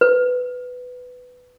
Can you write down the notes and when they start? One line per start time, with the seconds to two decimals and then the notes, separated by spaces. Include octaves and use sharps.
0.01 B4